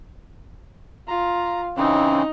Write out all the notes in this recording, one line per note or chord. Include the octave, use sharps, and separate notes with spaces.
F4 A#5
C#3 E3 C4 C#4 D#4